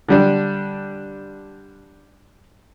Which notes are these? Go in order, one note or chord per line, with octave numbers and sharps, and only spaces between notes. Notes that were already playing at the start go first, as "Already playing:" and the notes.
D3 G3 D4